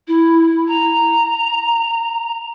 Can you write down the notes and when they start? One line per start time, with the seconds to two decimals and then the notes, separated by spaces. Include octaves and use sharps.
0.08 E4
0.68 A#5